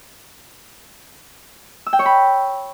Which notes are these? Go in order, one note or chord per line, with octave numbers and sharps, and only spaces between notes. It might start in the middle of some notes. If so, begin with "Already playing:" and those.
E6
G5
C#5
B5